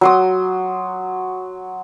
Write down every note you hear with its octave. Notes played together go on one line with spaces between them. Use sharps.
F#3 C6 D#6